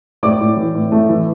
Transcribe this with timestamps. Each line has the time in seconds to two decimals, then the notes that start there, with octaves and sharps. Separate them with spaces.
0.23 A2 D5 D6
0.41 A2
0.57 E3
0.75 A2
0.92 A3
1.09 E3